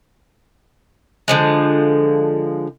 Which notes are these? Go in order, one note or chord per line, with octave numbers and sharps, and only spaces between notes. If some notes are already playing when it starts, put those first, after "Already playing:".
D3 F3 G#3